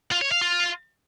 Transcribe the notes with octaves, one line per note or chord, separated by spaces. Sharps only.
F4
C#5
F5
F4